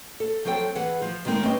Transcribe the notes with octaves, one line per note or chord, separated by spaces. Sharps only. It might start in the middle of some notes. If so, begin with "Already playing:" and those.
A4
F3 F#3 C4 A4 G5
E3 G#4 B4 F#5
F3 F4
D#3 G#3 C4 D#4 A#4
G3 C4 C#4 B4 D#5